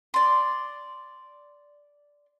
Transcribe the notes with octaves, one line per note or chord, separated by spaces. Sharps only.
D5 C6